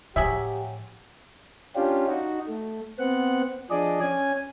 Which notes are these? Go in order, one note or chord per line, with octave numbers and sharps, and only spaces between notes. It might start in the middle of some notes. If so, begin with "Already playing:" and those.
A2 F3 F#3 G4 G#4 E5
C#4 D4 F4 G4
D#4 F#4
A3
B3 C4 F#5
F3 D4 G#4 D5 D#5
C#4 G#5